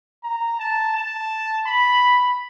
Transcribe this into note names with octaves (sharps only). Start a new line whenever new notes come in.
A#5
A5
A5
B5